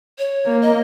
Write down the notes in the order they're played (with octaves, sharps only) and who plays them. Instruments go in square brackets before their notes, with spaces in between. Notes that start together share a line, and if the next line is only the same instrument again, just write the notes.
[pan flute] C#5
[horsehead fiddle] A#3
[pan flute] D#5